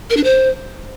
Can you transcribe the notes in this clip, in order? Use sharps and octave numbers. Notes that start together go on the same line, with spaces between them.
A#4
D4
C5